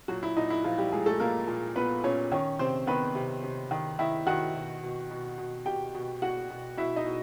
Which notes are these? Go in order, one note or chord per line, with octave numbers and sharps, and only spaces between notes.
A#2 F#3 F#4
E4
A#2 D#4
E4
A#2 F3 F4
G3 G4
A#2 G#3 G#4
A3 A4
A#2 A#3 A#4
A#2
A#2 B3 B4
A#2 C#4 C#5
D#3 C#4 C#5
C3 C4 C5
D#3 B3 B4
C3
C3
D#3
D#3 E4 E5
D#3 F#4 F#5
B2
B2
B2
B2
B2 G4 G5
B2
B2 F#4 F#5
B2
B2 E4 E5
D#4 D#5
B2